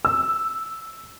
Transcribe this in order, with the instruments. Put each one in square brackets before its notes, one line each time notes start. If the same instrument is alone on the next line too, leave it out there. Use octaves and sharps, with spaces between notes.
[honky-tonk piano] E6